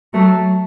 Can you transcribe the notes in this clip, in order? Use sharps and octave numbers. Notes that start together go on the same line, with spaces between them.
F#3 A3